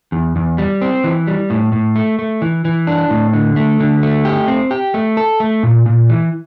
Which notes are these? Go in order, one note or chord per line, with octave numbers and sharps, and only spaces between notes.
E2
E2
G3
C4
E3
G3
A2
A2
A3
A3
E3
E3
D4
A2
D3
A3
D3
A3
G4
C4
G4
A3
A4
A3
A#2
A#2
E3